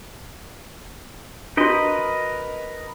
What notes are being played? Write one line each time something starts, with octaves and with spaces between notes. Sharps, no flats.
D4 F#4 A#4 B4 D#5